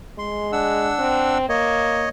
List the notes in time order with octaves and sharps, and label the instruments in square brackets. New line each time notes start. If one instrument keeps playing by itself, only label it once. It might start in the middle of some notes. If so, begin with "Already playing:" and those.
[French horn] G#3 [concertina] C6
[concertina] D4 F#5 E6
[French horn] C4
[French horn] A#3 [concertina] C#5 D#5